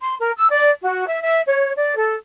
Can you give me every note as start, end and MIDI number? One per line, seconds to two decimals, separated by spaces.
0.01 0.15 84
0.19 0.31 70
0.36 0.48 88
0.50 0.69 74
0.82 1.06 66
1.07 1.21 76
1.22 1.41 76
1.47 1.72 73
1.77 1.93 74
1.97 2.15 69